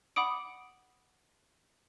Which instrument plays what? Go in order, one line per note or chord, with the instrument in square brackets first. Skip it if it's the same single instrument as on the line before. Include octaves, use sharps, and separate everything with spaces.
[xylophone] F#5 B5 D6 D#6 D7